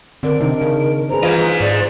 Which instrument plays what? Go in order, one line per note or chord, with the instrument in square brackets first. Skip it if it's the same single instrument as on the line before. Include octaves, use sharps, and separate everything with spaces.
[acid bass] D3 [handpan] C4 D5 [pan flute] A#4
[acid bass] C3 [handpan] D#3 D4 D#4
[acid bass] C#3
[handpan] G#4 B4 C5 [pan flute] A#5
[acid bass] E3 [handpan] F4 F5 [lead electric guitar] C5 D#5
[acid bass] G#2 [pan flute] D5